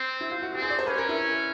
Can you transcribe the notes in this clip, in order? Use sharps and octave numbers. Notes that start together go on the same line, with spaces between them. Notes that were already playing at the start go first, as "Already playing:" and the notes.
Already playing: C4
E4
F4
F#4
C4 G4
G#4
D5
C5
C#4 B4
A#4
E4